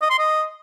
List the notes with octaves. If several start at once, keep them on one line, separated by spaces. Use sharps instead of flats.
D#5
C6
D#5